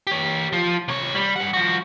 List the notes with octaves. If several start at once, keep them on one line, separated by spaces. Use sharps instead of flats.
G4 C#5
F3 F4
C3 C#5
G3
G2 F#5
F3 F#4